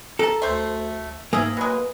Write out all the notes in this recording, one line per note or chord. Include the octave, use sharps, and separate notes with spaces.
A4 A#4 A5
D2 A3 C5
G#2 A#3 G#4 E5
F#3 G#3 B4